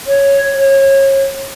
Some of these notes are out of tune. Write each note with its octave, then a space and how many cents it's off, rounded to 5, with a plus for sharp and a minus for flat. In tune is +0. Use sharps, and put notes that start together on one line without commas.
C#5 +0
C#5 -30